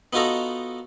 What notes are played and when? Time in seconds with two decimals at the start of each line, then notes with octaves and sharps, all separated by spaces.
0.13 B3 D#4 F4 F#4 A4 A#5